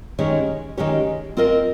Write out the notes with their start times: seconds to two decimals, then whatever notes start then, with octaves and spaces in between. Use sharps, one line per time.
0.19 D#3 G#3 C#4 G4 C#5
0.77 D#3 G#3 C#4 G4 C#5
1.37 C4 F4 A#4 D#5